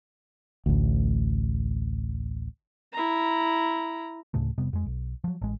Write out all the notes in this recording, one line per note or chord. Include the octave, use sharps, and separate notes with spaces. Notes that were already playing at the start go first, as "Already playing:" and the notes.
A1 D2
E4 A#5
D2 A2 C#3 A3
F1 C3 G3 B3
F2 G#3
B1
F3 F#3
A1 G#3